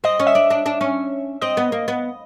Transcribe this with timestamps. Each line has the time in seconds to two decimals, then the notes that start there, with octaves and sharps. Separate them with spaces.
0.04 C4 D#5
0.19 C#4
0.27 E5
0.35 D4
0.50 D4
0.66 D4
0.81 C#4
1.41 C4 D#5
1.57 B3
1.72 A#3
1.88 B3